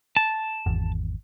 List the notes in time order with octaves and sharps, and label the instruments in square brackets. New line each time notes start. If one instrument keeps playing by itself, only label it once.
[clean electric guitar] A5
[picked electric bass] G#1 E2